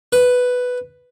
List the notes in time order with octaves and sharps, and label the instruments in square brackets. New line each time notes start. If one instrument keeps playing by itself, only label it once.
[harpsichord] B4